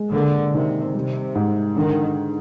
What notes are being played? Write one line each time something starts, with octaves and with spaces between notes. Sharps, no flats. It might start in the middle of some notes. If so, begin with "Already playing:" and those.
Already playing: G#3
D3 A#3
C3 D#3
C3 G3
G#2
D3 D#3